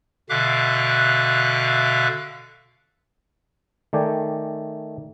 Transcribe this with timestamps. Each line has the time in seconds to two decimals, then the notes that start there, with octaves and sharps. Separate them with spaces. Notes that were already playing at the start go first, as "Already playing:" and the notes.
0.29 B2 D3 E5 F5 D6 F#6
3.93 D#3 A3 D5 G5 G#5